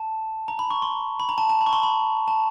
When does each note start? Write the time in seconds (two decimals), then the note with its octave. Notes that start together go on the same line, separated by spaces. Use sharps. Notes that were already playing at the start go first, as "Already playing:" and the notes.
Already playing: A5
0.48 A#5
0.59 B5
0.71 C#6
0.82 C6
1.20 B5
1.29 A#5
1.38 A5
1.50 A5
1.61 B5
1.66 C#6
1.73 C6
1.83 B5
2.28 A5